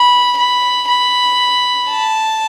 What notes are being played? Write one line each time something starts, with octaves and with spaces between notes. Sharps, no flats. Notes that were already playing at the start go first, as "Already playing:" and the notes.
Already playing: B5
B5
B5
A5